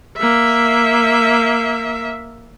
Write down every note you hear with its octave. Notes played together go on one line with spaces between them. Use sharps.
A#3 E5